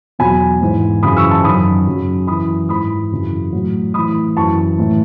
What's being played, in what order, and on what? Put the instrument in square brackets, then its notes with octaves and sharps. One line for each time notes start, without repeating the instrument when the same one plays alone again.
[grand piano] E2 B2 F#3 G#5 B5
G#2 E3
F#2 C#3 E3 B5 D#6
C#6 E6
A5 C#6
F#2 D#3 F#3 B5 D#6
F#2 C#3 F#3
F#2 E3 B5 D#6
G#2 E3 B5 D#6
F#2 C#3 E3
A2 F#3
A2 E3 B5 D#6
F#2 E3 A5 C#6
A2 E3